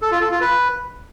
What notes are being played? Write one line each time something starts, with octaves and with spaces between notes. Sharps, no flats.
A4
F4
A4
F4
B4